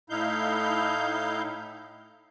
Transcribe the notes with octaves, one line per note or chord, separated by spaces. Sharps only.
A2 D#4 E4 F5 G6